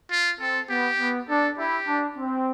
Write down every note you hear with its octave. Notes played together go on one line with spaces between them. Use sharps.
F4
C4 A4
B3 G4
B3
D4 A4
E4 G4
D4
C4